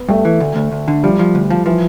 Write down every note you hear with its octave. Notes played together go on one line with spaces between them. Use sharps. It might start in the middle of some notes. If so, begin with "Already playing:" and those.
Already playing: B3
G2 A3
E3
D2
D2
D2
D3
F3 G3
F3
D2
F3
E3 F3